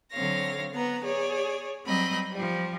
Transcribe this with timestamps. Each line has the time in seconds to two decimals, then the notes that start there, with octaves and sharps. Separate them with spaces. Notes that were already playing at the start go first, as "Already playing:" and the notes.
0.12 D3 F#3 C4 C#5 F5 A#6
0.74 B3 B4 A#5
1.04 G#4 C#5 D5
1.85 F#3 G3 C4 D#5 B5
2.33 F3 G3